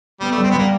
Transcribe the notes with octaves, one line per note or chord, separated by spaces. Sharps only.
G3 B3
A3
G3
C4
B3
G3 A#3